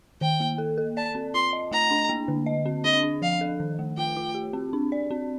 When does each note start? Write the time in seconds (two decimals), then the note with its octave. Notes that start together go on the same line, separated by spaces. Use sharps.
0.21 D#3 G5
0.40 A#3
0.58 A4
0.78 A4
0.97 D5 A5
1.15 C4
1.34 F4 C6
1.53 D#5
1.71 A3 A#5
1.91 D4
2.09 A#3
2.28 D3
2.46 D#5
2.66 C4
2.84 D4 D#5
3.03 D4
3.22 F3 F5
3.41 A4
3.60 D#3
3.79 A3
3.98 F4 G5
4.16 F4
4.35 G4
4.53 C4
4.73 D4
4.92 D5
5.11 C4